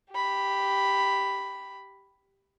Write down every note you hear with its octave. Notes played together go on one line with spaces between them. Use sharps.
G4 B5